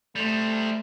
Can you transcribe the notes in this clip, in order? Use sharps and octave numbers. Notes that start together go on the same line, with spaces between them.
G3 A3 C5